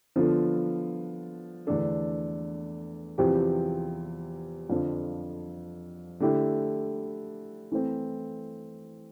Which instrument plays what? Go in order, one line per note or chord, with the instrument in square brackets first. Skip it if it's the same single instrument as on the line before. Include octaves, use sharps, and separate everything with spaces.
[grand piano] D3 F3 B3 F4 A4
E2 D3 A3 D4 A4
E2 C3 F3 C4 G4
F2 D3 F3
D3 A3 E4 G4
E3 A3 C4